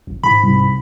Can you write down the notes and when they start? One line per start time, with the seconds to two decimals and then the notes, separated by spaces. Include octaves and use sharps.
0.07 G#1
0.23 G#2 B5
0.43 C2